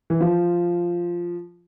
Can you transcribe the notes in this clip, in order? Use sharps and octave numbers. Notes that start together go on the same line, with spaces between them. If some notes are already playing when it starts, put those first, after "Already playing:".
E3
F3